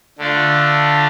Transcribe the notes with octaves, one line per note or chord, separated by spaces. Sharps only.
D3 A3 D4 F4